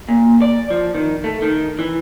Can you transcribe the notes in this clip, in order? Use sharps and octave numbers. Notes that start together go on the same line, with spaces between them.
A#2
D5
F3
D#3
A3
D#3
E3